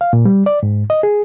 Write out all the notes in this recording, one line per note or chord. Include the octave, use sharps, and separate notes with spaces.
F5
A#2
G3
D5
G#2
D#5
G#4